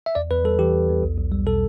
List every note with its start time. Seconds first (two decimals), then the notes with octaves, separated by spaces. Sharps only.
0.06 E5
0.15 E2 D5
0.31 E2 B4
0.44 G3 A4
0.59 E3 G4
0.73 E2
0.89 E2
1.03 B1
1.17 B1
1.32 G3
1.46 B2 A4